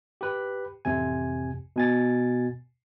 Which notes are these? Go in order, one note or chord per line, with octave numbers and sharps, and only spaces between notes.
G4 B4
A1 F2 C3 G#5
B2 G#5 A6